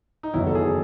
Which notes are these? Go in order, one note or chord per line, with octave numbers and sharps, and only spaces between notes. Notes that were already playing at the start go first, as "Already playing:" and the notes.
D#4
F#1 E2 D#3 F#3 E4
A4
G#4